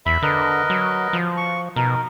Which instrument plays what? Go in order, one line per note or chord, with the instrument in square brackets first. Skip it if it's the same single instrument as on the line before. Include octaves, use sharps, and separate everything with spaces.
[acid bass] E2 [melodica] E5 B5
[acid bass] D3 [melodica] A#4 B4 D#5
[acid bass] F#3
F3
[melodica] C#6
[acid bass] B2 [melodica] D#4 A#4